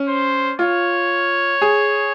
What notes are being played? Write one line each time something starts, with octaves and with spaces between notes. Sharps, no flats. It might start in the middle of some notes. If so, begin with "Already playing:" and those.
Already playing: C#4
C5
F4 C#5
G#4